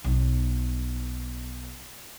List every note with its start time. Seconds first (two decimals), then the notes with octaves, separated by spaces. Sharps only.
0.04 B1 D#4